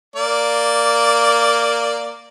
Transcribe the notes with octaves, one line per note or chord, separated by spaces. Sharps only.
A#3 D5